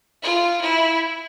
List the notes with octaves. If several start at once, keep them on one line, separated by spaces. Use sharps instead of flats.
F4
E4